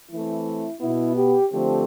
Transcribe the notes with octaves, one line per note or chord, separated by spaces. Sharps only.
E3 A3 C4 E4
B2 B3 E4
G4
D3 F3 A3 C4 G4